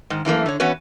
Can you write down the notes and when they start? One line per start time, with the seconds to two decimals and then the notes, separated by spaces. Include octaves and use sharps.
0.10 G#2 D#3
0.25 F#2 E3 A3 A#3
0.46 D3 C#5
0.60 E3 B3 C#4 F#4 B4 C#5